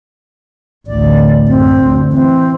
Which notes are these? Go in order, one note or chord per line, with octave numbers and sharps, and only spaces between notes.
A1 D2 D5
F#2 C4
D2
E3 C4